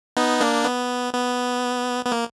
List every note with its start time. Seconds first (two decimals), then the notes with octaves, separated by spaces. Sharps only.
0.17 B3 D#4
0.41 A#3 D4
0.64 B3
1.13 B3
2.05 B3
2.12 A#3